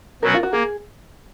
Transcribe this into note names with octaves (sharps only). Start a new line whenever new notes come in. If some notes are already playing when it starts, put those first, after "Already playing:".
B2 F#3 C#4 F#4 A#4
F4
F#4
A#3 G#4